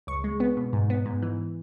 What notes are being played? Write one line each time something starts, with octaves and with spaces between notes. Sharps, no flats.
C#2 C#6
G#3
B3
B2
G#2
B3
G#2
E3